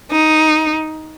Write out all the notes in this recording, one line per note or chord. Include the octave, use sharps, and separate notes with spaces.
D#4